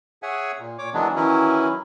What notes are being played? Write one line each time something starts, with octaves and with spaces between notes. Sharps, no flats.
G#4 C#5 E5 F#5 G#5
A#2
A#2 C#5 D6
D#3 E3 F#3 G#3 B3 D4
D#3 E3 F#3 C#4 E4